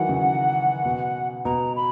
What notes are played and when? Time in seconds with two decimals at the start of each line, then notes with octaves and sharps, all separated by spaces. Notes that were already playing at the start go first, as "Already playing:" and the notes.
Already playing: D#3 E3 F#3 F#5
0.09 C#3
0.85 B2
1.45 B2 A#5
1.76 B5